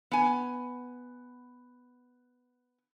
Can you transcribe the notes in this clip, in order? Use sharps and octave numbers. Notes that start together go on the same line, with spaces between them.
B3 G#5